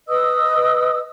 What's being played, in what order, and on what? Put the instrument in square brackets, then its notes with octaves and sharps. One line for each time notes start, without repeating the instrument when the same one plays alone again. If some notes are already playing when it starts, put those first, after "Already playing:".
[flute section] B4 D#5 D#6 E6